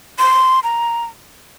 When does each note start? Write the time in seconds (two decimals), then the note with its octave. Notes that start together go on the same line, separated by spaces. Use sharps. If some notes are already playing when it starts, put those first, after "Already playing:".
0.19 C6
0.63 A#5